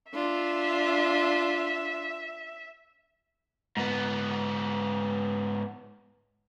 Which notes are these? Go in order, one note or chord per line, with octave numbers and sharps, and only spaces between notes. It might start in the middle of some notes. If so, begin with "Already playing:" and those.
D4 F4 E5
G#2 B3